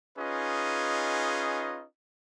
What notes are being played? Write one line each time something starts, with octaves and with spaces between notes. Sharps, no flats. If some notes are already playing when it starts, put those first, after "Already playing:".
C#4 D#4 F4 G#4 B4 D#5